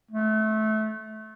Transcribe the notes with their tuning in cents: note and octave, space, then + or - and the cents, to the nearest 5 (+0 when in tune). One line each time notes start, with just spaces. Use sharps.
A3 -20